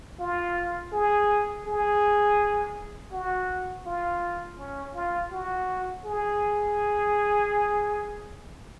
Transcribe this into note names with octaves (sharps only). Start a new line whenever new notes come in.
F4
G#4
G#4
F#4
F4
C#4
F4
F#4
G#4